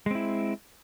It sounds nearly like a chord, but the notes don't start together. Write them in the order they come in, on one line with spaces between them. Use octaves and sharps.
G#3 C4 E4